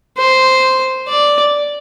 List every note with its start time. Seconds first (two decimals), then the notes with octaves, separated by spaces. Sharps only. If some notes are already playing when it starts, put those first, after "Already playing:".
0.17 C5
1.08 D5